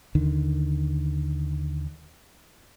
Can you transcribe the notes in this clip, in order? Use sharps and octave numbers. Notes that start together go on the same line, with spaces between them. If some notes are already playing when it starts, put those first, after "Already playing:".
D#2 D3 D#3